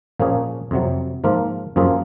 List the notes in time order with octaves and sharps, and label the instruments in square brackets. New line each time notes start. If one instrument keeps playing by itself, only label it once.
[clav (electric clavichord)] A#2 F3 A#3 C#4 G#4
F2 C3 F#3
G#2 F3 A#3 F4
F#2 F3 A#3 F4 G#4